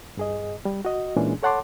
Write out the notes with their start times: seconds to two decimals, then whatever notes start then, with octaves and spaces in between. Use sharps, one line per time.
0.17 G2 G#4 D#5
0.65 G3
0.85 F#4 D#5
1.16 A#2 E3 G#3 C#4 D4 G#4
1.43 A4 C#5 F#5 A5 C6 D6